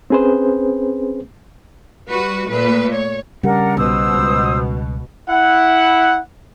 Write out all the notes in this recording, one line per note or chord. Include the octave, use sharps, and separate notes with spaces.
C4 C#4 G#4 B4 C5
G3 F#4 B4
A#2 A3 B4
C#5
C#3 G3 C#4 D4 A#4 F#5
B1 B2 C5 D#6 E6
C#2
E4 F#5